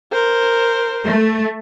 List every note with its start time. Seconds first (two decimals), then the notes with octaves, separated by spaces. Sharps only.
0.12 A#4 C5
1.06 A3